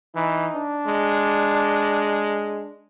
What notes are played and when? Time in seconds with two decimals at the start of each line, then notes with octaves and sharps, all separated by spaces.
0.15 E3 D#4
0.55 D4
0.87 G#3